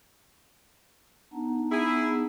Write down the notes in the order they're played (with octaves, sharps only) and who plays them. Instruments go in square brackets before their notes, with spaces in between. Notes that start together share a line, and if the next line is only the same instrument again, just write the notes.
[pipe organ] B3 D4 D#4
[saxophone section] E4 G#4